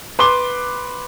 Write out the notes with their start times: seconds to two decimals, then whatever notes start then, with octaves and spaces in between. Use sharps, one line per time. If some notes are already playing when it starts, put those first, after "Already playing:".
0.19 B4 C6 D6 G7